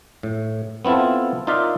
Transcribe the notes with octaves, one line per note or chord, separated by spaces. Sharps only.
A2
B3 C4 E4 F4 A4
D#4 F4 A#4 D5 E5 F5